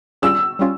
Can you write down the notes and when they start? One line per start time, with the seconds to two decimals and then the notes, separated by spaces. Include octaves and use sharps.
0.22 G3 C#4 F4 G#4 E6
0.59 G3 C#4 F4